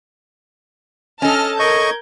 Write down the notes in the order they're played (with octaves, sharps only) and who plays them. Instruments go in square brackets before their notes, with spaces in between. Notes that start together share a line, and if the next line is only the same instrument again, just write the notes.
[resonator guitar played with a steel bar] C#4 A4 [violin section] D#5 A5 F6
[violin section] A#4 G6 G#6 [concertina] D#5 C#6